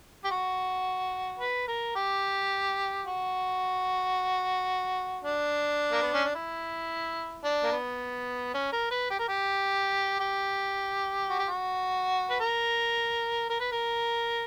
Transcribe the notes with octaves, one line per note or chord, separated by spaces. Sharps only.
G4
F#4
B4
A#4
G4
F#4
D4
A#3
B3
C#4
D4
E4
D4
A#3
B3
C#4
A#4
B4
G4
A#4
G4
G4
F#4
G4
F#4
B4
A#4
A#4
B4
A#4